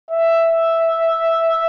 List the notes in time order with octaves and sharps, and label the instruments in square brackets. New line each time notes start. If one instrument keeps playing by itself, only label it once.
[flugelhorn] E5